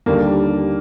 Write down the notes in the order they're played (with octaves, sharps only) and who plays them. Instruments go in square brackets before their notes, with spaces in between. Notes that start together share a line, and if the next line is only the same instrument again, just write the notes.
[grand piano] D#2 D3 G3 D4 [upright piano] A#3